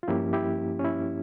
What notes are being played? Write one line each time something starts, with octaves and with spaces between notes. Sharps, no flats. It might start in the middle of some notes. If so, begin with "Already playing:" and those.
F4
G2 F3 A#3 C#4 E4 G4
E4 G4
C#4
E4